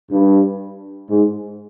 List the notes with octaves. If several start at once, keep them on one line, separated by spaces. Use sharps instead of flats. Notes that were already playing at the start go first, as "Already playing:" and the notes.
G2
G#2